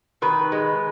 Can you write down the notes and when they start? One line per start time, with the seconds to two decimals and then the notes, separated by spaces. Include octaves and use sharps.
0.22 D#3 B4
0.52 G#3